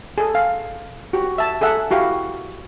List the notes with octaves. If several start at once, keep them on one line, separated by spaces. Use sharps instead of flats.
G#4 A4
F5
F#4 G4
E5 A5
G#4 A4 E5 F#5
E4 F#4 G4 F5